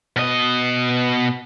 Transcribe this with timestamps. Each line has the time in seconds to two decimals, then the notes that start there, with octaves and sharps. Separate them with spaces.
0.16 B2 D#5